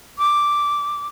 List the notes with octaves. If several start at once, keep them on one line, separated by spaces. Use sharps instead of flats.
D6